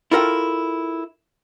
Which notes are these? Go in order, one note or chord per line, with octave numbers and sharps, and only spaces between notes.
E4 F4 A4 A#4 D#5 G5